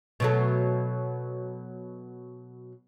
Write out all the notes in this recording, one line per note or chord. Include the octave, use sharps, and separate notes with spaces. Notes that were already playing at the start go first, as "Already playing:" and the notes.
B2 F#3 A3